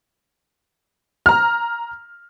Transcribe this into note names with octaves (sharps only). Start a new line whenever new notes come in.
A#5 F6